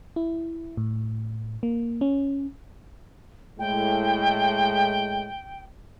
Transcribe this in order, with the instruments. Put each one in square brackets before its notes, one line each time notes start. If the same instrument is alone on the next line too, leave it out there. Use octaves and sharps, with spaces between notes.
[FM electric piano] E4
A2
A#3
C#4
[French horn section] A2 G#3 [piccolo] G5